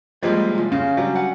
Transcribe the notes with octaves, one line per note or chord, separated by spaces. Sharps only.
C#2 F3 G3 G#3 A#3 C#5
C3 F4
C#3 C#4 F5
F#3 G3 D4
F#5